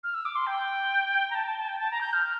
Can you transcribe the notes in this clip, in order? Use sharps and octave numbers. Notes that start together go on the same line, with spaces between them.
F6
E6
D6
C6
G5
A#5
A5
A5
A5
G5
A5
A#5
G6
F6